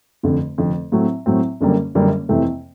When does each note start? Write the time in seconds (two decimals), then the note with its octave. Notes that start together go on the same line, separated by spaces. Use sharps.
0.23 F1 F2 D3
0.58 F1 F2 D3
0.92 A2 F#3 A3 C4
1.26 A2 F#3 A3 C4
1.61 F#1 F#2 D3 G3 A#3
1.95 F#1 F#2 D3 G3 A#3
2.29 F2 C3 E3 A3 C4